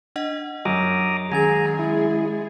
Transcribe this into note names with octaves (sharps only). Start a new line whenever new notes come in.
D4 D#5 F#5
F#2 A#5 D6 D#6
D#3 G#3 C#4 G#4 G#5 A#5 A6
E4